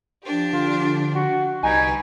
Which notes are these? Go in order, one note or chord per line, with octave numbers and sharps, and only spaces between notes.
F3 D4 G4
D3 F4
F#4
C2 G3 D#4 G4 B4 G#5